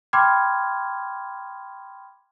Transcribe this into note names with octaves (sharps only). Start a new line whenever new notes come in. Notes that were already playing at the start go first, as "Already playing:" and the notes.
G5 B5 C6 D6 F6 G#6